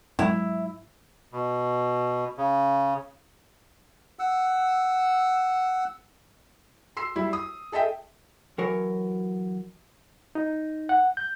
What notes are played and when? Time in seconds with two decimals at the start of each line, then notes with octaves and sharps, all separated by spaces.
0.19 G#2 F#3 G#3 E4
1.32 B2
2.38 C#3
4.19 F#5 E6
6.97 C6 E6 C7
7.16 G3 E4
7.33 D#6
7.72 G#4 A4 D#5 E5 G5
8.58 E3 F#3 A#4 C#5
10.35 D#4
10.89 F#5
11.17 G6